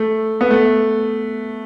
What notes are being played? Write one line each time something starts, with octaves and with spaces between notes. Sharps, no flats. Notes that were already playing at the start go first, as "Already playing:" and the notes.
Already playing: A3
B3
A3